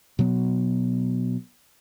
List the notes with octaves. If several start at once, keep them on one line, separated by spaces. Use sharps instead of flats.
B2 F#3 B3